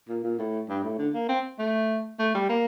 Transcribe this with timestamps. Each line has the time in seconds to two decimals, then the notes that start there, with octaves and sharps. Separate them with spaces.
0.09 A#2
0.24 A#2
0.39 A2
0.69 G2
0.84 A2
0.98 D3
1.14 A#3
1.29 C4
1.59 A3
2.19 A3
2.35 G3
2.49 A#3